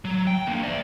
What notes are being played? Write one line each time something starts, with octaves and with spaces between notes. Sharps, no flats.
F#3
G5
D3 A#3
D5 E5